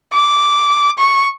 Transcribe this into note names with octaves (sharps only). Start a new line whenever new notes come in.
D6
C#6